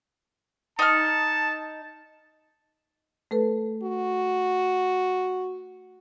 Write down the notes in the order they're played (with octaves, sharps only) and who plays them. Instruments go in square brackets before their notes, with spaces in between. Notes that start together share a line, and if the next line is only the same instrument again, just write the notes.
[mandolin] D#4 F6 [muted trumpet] A5
[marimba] A3 A4 B4
[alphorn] F#4